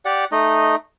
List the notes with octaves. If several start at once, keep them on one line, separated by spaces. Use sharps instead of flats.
G4 D5 F#5
A3 D#4 D#5